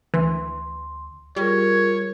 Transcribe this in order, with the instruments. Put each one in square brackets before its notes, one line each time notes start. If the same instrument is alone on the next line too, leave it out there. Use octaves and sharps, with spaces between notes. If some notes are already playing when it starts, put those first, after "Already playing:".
[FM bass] D2 [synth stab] E3 [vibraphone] C6
[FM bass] G3 [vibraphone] F4 G#4 A#4 [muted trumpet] C#5